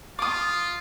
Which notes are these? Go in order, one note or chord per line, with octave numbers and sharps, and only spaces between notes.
F4 D6 D#6